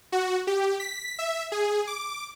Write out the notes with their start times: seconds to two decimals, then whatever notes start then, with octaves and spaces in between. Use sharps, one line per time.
0.12 F#4
0.47 G4
0.80 B6
1.19 E5
1.52 G#4
1.87 D6